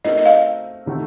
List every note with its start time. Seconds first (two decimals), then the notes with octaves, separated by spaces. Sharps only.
0.05 A3 C4 D#4 F#4 A#4 D#5
0.17 D#5
0.25 F5
0.86 C3 D#3 A3 C4 F#4